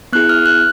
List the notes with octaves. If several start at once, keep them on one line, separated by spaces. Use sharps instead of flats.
B3 E4 G#4 F#6
F6
F#6